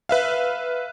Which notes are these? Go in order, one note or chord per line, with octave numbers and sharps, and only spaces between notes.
B4 E5 F5